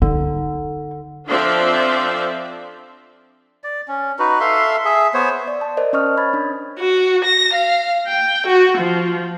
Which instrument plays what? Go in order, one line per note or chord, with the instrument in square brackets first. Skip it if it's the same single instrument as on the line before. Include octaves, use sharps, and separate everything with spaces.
[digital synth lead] D3 [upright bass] D#4
[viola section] F3 C4 D4 A4 D5 E5
[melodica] D5
C#4
D#4 F#4 B4
A4 E5 F5 C6
G#4 E5
B3 C5 C#5
[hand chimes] D5
A5
A#4 C5 D5 D#5
C#4 C5 D#5 C#6 D#6 F6
C#5 B5 G#6 A6
D4
[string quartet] F#4
A#6
F5
G5
F#4
F3